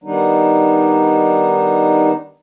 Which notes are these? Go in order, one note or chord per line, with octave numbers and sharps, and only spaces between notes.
D#3 G3 B3 D4 D#4